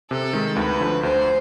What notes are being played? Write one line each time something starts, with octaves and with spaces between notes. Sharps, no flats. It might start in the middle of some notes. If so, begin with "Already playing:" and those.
C3 A4
D#3 G#3
D2 B4
D3 F3
D2 C5